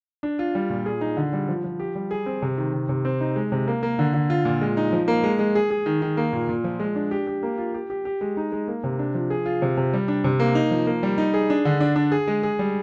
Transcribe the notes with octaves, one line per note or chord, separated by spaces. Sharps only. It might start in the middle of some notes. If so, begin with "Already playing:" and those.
D4
F4
G3
A#2
G#4
D#4
D3
G3
F3
F3
G4
G3
G#4
C4
C3
D#3
C3
C3
C4
D#4
G#3
C3
A#3
A#3
D3
D3
F4
A#2
G#3
D#4
F3
A#3
G#3
G#3
G#4
G#4
D#3
D#3
A#3
A#2
A#2
F3
G#3
D4
G4
G4
A#3
F4
G4
G4
G4
G#3
D#4
G#3
A#3
C3
D4
F3
G#4
F4
C3
C3
G3
D4
C3
A#3
D#4
F3
A#3
G3
D#4
G#4
D4
D3
D4
D4
G#4
G#3
G#4
G3